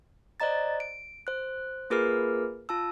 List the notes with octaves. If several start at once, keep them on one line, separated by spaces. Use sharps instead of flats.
C5 D5 D#5 A#5 A6
D7
C5 F#6
A#3 F4 G#4 A#4 B4 F6
F4 A5 E6